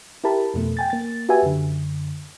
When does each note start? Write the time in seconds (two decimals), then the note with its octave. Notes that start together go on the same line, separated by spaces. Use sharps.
0.24 E4 G4 A#4 A5 B5
0.54 F2 B2 A3
0.77 G5 G#5 A6
0.90 A#3 A6
1.29 F#4 G4 B4 E5 G#5
1.43 F#2 D3